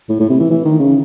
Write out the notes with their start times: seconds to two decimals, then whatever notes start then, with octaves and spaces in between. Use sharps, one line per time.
0.10 A2
0.20 A2
0.30 C3
0.40 E3
0.51 E3
0.65 D#3
0.80 C#3